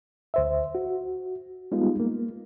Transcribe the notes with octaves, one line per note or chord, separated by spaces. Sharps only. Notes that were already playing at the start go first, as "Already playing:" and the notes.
D2 C5 E5
F#4
G3 G#3 B3 D#4 F4
A#3